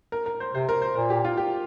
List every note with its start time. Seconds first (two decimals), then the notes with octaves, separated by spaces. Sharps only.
0.12 A#4
0.26 A#4
0.40 C5
0.54 C3 C5
0.69 A#4
0.82 C5
0.95 A#2 A#4
1.10 G4
1.25 F4
1.37 G4